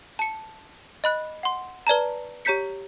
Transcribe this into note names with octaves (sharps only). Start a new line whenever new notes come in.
A5 C#7
D#5 B5 F#6
F#5 C6
B4 D5 A5 A#5
G4 C#5 A#5 G6 B6 C#7